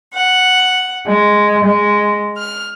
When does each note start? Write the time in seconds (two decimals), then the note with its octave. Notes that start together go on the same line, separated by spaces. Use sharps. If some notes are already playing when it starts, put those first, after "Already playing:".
0.13 F#5
1.07 G#3
1.64 G#3
2.38 F6